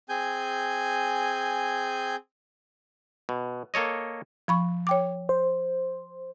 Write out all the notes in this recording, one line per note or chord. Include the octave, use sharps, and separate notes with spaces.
C4 G#4 G#5 G6
B2
A#3 A4 C#5 D#5
F3 B5 C#6
C#5 G5 D6
C5